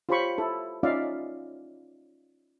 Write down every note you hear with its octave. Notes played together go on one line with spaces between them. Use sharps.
F4 G4 C5 C#5 B5 C#6
E4 A4
C#4 D#4 F4 D5 E5 F5